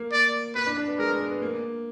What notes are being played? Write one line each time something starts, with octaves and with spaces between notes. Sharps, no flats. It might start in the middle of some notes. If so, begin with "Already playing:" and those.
Already playing: A#3
D5
B3 B4
D4
D4
B3
G#3 A#4
B3
B3
B3
A#3